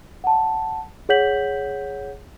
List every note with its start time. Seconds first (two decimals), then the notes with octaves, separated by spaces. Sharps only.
0.24 F#5 A5
1.09 G#4 C#5 F#5 G6 B6 F#7